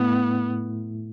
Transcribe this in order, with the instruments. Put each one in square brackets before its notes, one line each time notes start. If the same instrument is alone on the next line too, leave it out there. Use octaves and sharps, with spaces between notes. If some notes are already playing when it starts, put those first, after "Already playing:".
Already playing: [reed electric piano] A2 A3 E4 [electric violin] B3